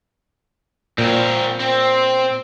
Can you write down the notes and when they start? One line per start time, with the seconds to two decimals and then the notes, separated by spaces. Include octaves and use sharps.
0.98 A#2 C4 A#4
1.60 C4